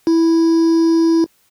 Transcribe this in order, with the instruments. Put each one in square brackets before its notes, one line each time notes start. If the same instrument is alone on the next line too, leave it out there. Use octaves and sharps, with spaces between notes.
[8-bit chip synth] E4